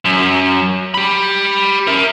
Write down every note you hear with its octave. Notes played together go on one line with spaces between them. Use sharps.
F#2
G4 B5
A#4 E5